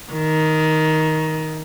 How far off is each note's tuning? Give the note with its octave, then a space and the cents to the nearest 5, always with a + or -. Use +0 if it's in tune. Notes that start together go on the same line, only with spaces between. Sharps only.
D#3 +10